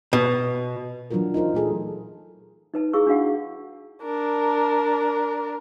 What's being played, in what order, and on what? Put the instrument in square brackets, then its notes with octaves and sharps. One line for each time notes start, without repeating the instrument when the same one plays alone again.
[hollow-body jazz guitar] B2
[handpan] E3 F#3 D4 F4 F#4 A#4
D#4 F4 A#4 C5
A#2 A3 G#4 A4
[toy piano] D#4 B4 A5
E4 G#4 F5 C#6 E6
D4 F#4 F5 F#5
[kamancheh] D4 A#4